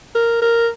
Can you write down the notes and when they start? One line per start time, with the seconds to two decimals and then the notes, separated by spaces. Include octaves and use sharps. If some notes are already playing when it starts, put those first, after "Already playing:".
0.15 A#4
0.42 A#4